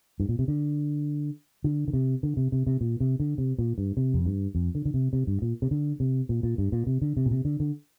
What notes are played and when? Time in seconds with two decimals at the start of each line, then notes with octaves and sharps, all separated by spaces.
0.20 G2
0.29 A#2
0.39 C3
0.48 D3
1.64 D3
1.88 D3
1.93 C3
2.23 D3
2.37 C3
2.52 C3
2.67 C3
2.81 A#2
3.00 C3
3.20 D3
3.38 C3
3.58 A#2
3.78 G2
3.97 C3
4.14 F2
4.26 G2
4.55 F2
4.75 D3
4.85 D3
4.94 C3
5.13 C3
5.27 G2
5.42 A#2
5.62 C3
5.71 D3
6.00 C3
6.29 A#2
6.43 A#2
6.58 G2
6.72 A#2
6.87 C3
7.02 D3
7.17 C3
7.26 A#2
7.31 C3
7.45 D3
7.60 D3